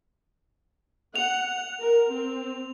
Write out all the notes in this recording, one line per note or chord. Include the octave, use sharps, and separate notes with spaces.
F#5 F7
A#4
C4